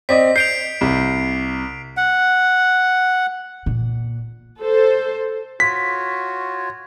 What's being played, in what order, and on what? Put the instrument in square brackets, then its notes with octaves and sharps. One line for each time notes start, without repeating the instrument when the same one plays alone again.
[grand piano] C4 D5 D#5 [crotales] B6
[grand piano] G6 [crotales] C7 D7 F7
[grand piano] C2
[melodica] F#5
[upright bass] A#2
[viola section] A4 C5
[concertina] F4 F#4 C#5 [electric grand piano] B6